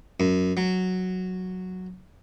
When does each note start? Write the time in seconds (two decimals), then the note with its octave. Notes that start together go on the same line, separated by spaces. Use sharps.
0.20 F#2
0.57 F#3